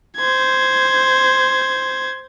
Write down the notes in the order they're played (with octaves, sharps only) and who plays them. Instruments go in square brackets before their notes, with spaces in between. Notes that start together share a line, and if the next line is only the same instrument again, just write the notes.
[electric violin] C5 G#6